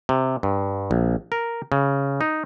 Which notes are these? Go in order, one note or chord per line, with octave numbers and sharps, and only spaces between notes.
C3
G2
A#1
A#4
C#3
D#4